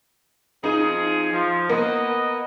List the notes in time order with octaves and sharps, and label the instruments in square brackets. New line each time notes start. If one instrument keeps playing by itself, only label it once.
[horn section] F3 C4 G#4 [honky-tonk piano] D#4
[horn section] F3
[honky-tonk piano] A#3 [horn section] B3 B4 D#5